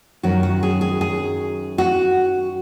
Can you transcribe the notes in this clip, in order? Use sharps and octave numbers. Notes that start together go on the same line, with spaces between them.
F#2 D#3 F#3 F#4
F#4
G#4
G#4
G#4
F#4